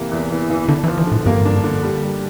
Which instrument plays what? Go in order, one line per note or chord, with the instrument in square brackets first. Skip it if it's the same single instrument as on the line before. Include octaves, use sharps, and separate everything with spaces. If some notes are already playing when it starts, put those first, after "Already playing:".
Already playing: [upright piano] C3 E3 A#3
E2
E3
E3
[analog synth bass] D3 [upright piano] D4
[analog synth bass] E3
[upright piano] F3
[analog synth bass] E3
[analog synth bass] A2 [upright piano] D3
[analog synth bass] G2 [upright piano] A#3
[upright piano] D4
D3
G3
G3